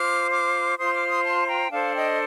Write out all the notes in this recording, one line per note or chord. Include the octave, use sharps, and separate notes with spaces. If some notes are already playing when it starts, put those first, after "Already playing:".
Already playing: F4 C5 D6 F6
D6 F6
F4 C5 C6 D#6
G6
D6 F6
C6 D#6
A5 C6
G5 A#5
D4 A4 C5 F5 A5
D#5 G5